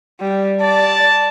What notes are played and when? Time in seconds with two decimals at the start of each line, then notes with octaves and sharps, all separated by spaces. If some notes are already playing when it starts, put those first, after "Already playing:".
0.20 G3
0.61 D5 A5